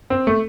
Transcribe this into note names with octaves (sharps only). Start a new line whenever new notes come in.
C4
A3